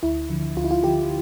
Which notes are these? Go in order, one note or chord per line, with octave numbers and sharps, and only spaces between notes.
D2 E4
D3 F3
D2 F4
E4
F4
D3 F3 G4